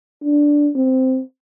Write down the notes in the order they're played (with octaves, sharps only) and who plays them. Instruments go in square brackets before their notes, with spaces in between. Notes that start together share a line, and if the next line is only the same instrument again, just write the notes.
[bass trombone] D4
C4